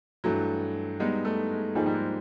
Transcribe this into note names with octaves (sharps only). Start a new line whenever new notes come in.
G2 E3 F#3 A3
G3 G#3 B3 D#4
A3
G#3
G#2 F3 G3 A#3 D#4 G#4
G3
G#3